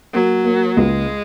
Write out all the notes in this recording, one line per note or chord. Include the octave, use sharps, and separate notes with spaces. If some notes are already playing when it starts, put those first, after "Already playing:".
F#3 A#3
A#3
C#2 G#3